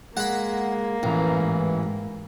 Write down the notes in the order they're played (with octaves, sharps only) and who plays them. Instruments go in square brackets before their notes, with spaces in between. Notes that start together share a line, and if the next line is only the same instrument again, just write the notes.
[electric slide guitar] G#3 [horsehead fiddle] A#3 [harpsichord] F#5 B5
[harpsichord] A1 [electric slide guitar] F2 A#5 [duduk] E3
[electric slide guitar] G#2